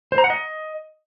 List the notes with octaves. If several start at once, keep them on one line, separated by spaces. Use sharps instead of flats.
C5
A#5
F#5
D#5